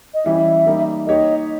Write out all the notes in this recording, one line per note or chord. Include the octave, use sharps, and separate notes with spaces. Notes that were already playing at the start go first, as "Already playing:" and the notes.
D#5
E3 G3 C#4 E4 E5
G3 A#3 D#4
A#3 D#4 G4 C#5 D#5